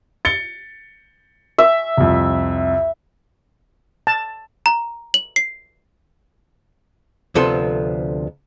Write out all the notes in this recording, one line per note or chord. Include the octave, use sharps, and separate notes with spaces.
A6 C#7 G7
E5
C2 F2
A5
A#5
F#7
C7
D2 C3 F3 B3 A4 C6